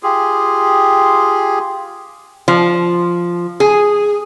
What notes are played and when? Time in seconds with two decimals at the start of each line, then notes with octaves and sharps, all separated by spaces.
0.03 F4 G4 G#4
2.48 F3
3.60 G#4